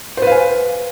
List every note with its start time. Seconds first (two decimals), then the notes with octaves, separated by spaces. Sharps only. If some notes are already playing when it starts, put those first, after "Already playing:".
0.17 C5
0.22 B4
0.27 F5
0.32 G#5